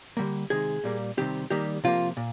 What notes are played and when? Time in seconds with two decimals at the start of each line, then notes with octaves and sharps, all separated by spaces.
0.17 D3 G3 A#3
0.50 C3 D#3 G#3 G#4
0.84 A#2 G3 A#3
1.17 C3 D#3 G3 C4 G4
1.50 D#3 G3 A#3 G4
1.84 C3 F3 A#3 F4
2.17 A#2